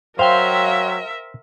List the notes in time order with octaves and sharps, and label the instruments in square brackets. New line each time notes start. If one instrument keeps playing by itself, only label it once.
[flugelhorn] F#3 [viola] A#4 E5 [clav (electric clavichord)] C5 [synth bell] F5 G5 C6